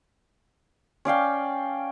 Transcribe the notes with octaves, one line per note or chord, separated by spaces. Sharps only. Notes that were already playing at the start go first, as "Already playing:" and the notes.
C#4 D5 F5 G5